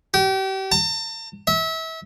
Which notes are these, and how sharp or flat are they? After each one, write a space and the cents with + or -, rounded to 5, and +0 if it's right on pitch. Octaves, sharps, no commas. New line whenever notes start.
G4 -35
A5 +45
E5 -30